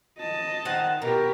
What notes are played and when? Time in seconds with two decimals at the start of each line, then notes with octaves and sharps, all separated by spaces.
0.19 D#5 A5
0.65 D#3 C5 F#5
1.02 B2 G4 A#4